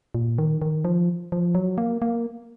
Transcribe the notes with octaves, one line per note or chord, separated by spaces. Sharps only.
A#2
D#3
D#3
F3
F3
F#3
A#3
A#3